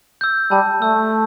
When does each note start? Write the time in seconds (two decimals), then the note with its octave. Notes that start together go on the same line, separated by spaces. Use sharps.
0.21 E6 G6
0.51 G3 A5
0.81 A3 E6 G6